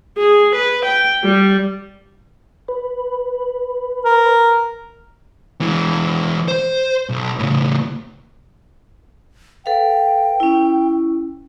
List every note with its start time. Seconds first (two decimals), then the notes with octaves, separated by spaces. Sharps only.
0.17 G#4
0.54 B4
0.85 G5
1.24 G3
2.68 B4
4.05 A#4
5.61 E3 G#3
6.48 C5
7.09 B1
7.39 A2 C#3
9.66 A4 B4 F5 G5
10.40 C#4 E4